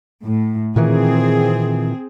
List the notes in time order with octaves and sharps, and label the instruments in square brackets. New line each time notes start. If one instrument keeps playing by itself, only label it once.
[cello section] A2
[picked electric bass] A#2 D#3 E3 [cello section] C4 G#4